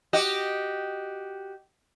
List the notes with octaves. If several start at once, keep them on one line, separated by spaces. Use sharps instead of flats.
F#4 G4 D#5